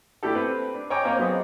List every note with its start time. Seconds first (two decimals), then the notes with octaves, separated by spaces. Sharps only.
0.23 A3 D4 E4 G4 A4
0.35 A3 C4 B4
0.74 D4
0.90 C#5 D#5 G5 G#5 A#5 D6
1.05 A#3 C4 C5 C#5
1.18 F#3 B3 C4 G#4 D#5